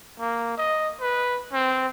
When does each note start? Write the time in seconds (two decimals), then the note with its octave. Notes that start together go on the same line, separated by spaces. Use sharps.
0.20 A#3
0.57 D#5
1.01 B4
1.53 C4